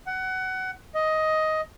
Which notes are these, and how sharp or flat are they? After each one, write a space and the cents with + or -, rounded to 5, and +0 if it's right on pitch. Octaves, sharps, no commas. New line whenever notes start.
F#5 +20
D#5 +10